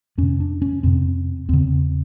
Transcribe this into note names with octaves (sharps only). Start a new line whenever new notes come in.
F2 C3 C#4
D4
C#4
F2 C3 C4
E2 C#3 C4